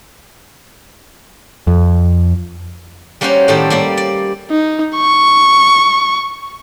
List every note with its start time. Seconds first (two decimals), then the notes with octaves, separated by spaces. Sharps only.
1.67 F2
3.21 G3 A#3 C#4 F#4 C5
3.48 A2 D#3 G3 A4 C5 D5
3.70 G3 A#3 D5
3.97 D5
4.51 D#4
4.97 C#6